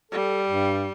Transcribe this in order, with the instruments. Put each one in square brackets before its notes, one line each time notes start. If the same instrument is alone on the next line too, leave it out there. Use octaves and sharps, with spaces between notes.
[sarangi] G3 [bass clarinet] A4
[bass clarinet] G2